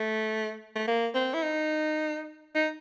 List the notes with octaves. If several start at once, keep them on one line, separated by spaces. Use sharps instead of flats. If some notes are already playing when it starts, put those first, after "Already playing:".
Already playing: A3
A3
A#3
C4
E4
D#4
D#4